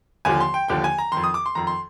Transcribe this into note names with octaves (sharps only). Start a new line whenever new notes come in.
D#2 D3 F3 G#5
C6
G5
D#2 D3 F3 G5
G#5
A#5
F2 D#3 C6
D#6
D6
C6
F2 D#3 A#5
C6